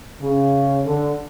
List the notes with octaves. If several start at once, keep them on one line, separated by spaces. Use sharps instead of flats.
C#3
D3